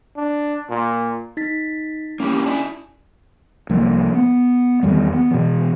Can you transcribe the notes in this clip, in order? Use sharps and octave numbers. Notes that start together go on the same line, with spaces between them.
D4
A#2
D#4 A6 B6
A#3 C#4 E4 G4
D4 E4 G#5
C2 F3 A#3
B3
E2 D#3 G3
B3
B2 E3